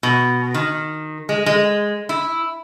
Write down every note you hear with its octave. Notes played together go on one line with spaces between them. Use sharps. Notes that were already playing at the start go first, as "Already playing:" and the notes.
B2
D#3
G#3
G#3
E4